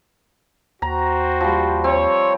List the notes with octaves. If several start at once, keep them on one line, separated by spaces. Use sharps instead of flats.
D#2 F#4 C5 G5 A#5
F3 G3
C4 C#5